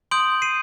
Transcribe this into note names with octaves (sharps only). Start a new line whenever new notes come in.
C6 D#6 G6 D7 F#7
C7 D#7